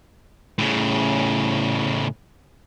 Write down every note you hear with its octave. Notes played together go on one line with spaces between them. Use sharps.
A2 C#3